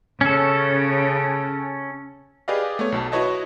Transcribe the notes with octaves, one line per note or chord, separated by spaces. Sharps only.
C#3 C#4 A4
G4 G#4 B4 D5 D#5 F5
A3 B3 C#5
B1 B2 A5
E4 F#4 B4 C#5 D#5 A5